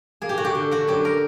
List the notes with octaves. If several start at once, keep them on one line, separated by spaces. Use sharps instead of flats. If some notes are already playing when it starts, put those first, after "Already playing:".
A#3 G#4
G4
D3 F#4
G4
D3
D3 F#4
F#2 G4
A#4